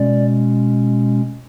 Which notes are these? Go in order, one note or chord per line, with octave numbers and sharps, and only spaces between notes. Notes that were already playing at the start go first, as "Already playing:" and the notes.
Already playing: B2 G#3 C#4 D5